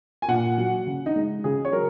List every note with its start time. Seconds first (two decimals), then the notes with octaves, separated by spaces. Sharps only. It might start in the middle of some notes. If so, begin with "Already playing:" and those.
0.22 G#5
0.28 A#2 F#5
0.58 F#3
0.86 C#3
1.06 D#4
1.16 G#3
1.44 C#3 G#4
1.65 C#5
1.73 F#3 A#4